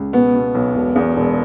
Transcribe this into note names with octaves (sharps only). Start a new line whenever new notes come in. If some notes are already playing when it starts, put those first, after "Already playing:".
Already playing: C#2
B2 B3
B2
B1
E1
E2
E1